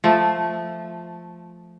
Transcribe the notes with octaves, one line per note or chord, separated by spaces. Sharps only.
F3 A3